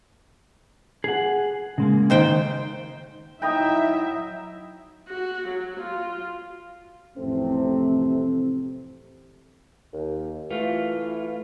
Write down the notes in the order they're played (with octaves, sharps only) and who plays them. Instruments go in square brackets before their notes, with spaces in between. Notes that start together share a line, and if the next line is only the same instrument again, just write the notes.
[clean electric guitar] G#4 F#5
C#3 G#3 A#3
[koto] D#3 C5 G5
[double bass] F#3 E4 [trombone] D#4 [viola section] E5 [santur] G5 A#5 D#6
[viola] F#4
F#3
F4
[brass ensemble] A1 F2 C3 A3 C4
[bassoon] D#2
[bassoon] E3 [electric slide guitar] A3 F4